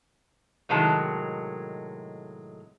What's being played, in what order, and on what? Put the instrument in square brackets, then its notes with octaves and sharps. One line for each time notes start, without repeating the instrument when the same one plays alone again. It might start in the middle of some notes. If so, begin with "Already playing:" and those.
[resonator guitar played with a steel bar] A2 C3 D#3 F#3 G#3 A5